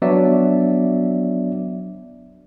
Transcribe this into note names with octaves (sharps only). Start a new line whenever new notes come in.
F#3 B3 D4 F#4 D5 E5